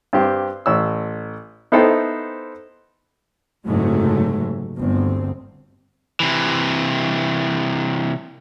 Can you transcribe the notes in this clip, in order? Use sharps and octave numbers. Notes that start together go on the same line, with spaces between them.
G2 C4 G4
A1 E6
B3 D#4 E4 A4 C5 G5
F#1 G#2 C3 F#3 G#3 A3
G1 D2 C4
C3 E3